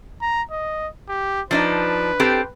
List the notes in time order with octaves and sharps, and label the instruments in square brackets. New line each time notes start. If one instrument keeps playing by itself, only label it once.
[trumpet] A#5
D#5
G4
[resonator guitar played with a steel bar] F3 D4 D#4 [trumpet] B4
[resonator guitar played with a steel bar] C4 G4 A4